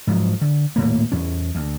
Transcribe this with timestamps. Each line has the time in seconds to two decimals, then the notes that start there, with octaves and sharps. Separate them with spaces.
0.07 G#2 F3 F#3
0.41 D3
0.76 D#1 A2 A#3
1.12 E2 C#4
1.55 D2